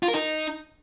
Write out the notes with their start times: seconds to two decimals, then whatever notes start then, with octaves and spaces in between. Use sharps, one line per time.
0.03 F4
0.08 A#4
0.14 D#4